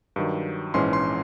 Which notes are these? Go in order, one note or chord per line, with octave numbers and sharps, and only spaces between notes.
G2 D#3 F#3
A#1 G#2 E3 G#3 C#4 C6
C6